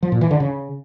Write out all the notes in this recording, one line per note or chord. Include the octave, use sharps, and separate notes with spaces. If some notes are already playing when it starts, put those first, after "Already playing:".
F3
A#2
E3
D3
C#3